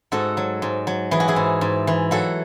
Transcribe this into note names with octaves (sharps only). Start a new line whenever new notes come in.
G#2 F#4 A4
F#3
G#2
F#3
E3 G#4
F#4
E4 G#4
G#2
G#2
E3
F#3 F#4 A4